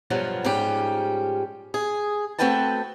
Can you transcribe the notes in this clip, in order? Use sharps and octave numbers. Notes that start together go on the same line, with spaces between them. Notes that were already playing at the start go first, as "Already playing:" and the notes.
G2 B2 F3 F#3
G#2 F3 G3 C#4 G4
G#4
A3 C4 F#4 B4 G5 A5